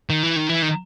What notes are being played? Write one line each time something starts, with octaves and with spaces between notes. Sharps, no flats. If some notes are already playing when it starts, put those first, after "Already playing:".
D#3
E3
D#3
E3
D#3